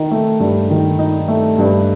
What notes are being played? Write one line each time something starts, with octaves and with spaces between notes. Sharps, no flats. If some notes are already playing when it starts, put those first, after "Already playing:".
Already playing: D#3 D#4
A3
G2
D#3
D#4
A3
G2